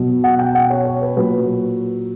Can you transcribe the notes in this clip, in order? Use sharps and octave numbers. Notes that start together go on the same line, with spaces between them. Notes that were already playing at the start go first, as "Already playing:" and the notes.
Already playing: B2 F#3
F#5
G5
F#5
C#5
C#5
B4
A#2 F#3 B4